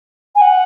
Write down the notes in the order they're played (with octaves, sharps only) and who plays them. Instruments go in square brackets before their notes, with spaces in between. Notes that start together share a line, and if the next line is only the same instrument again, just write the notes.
[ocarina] G#5
F#5